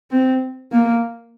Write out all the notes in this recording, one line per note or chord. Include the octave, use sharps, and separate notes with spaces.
C4
A#3